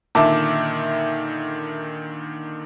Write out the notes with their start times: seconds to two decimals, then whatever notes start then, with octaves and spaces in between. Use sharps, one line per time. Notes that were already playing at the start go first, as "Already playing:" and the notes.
0.15 A#2 D3 D#3 E5 A5 D6